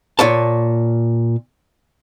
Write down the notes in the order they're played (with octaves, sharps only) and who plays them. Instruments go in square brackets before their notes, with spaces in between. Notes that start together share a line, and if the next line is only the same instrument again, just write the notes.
[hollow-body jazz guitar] A#2 C#5 A5